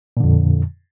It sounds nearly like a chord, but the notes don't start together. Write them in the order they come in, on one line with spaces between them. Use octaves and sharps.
A#2 D3 F2